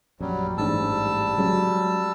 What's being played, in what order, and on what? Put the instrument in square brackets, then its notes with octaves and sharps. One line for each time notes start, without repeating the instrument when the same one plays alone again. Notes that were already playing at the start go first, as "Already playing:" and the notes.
[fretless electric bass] A#1 F#2 [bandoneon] F#3 G3
[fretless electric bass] A1 G#2 D4 [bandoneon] G3 A5 E6
[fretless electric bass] F#3 G#3 C#4